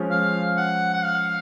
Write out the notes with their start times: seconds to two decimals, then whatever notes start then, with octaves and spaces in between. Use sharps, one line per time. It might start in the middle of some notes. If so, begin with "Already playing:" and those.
Already playing: F3 G#3 C#4
0.11 F5
0.57 F#5
0.94 F#5
1.03 F5